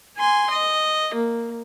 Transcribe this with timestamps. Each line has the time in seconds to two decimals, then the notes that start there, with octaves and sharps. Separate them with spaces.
0.17 G#5 C6
0.50 D#5
1.14 A#3